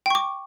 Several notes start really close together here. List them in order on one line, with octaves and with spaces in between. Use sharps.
G5 C#6 D6